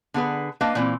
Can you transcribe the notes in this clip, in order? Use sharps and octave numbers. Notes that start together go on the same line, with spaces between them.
D3 B3 G#4 B4
A#3 D4 B4 D#5 F5
A#2 E3 C4